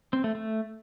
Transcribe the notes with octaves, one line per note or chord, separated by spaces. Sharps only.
C4
A3
A3